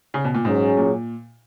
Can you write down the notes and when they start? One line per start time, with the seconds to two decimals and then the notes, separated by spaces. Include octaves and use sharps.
0.14 C#3
0.24 B2
0.34 A#2
0.45 G#2 F#3 C#4 G#4
0.77 A#2